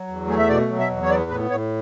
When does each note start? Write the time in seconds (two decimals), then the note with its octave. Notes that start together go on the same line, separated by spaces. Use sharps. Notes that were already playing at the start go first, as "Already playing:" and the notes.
Already playing: F#3
0.08 E2
0.27 A3 G#4
0.39 E5
0.49 B2 D5
0.68 F#3
0.79 E5
0.90 E2
1.03 C#5
1.09 B3 D5
1.30 A2 B4
1.50 A2 C#5